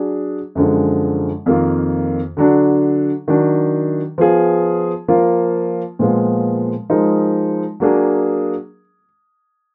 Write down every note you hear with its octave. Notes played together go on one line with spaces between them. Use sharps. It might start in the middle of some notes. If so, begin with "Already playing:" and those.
Already playing: F#3 D4 G#4
F#2 D3 F3 G#3
F2 D#3 A#3 F4
D3 F#3 D4
D#3 F#3 D4
F3 B3 F4 G#4
F3 A#3 F4 A#4
A#2 F3 G#3 B3 F4
F3 G#3 D#4 A#4
F#3 A#3 D4 G#4